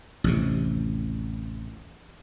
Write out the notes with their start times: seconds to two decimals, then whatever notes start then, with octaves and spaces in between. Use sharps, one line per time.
0.24 A1 D#2 C3